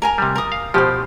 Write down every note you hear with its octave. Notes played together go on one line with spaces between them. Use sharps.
A#4 G#5 A#5
C3 G3
A#4 D#6
F5
B2 F3 G4 C5